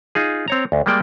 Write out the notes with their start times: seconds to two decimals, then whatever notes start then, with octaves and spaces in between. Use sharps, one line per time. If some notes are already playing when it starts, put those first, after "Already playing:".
0.15 D#4 F4 G#4
0.48 C4 C#5 A#5
0.72 D2
0.86 G3 G#3 A#3 D5 G5